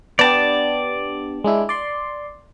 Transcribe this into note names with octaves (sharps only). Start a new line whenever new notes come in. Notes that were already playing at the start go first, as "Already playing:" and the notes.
B3 D4 G4 D5 A5
G#3 D4 E4
D5 C6